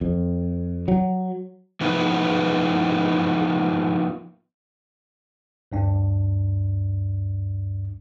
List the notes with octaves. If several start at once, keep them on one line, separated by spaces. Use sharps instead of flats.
F2
F#3
F3 A#3 B3 D#4 B4
D2 G2 D4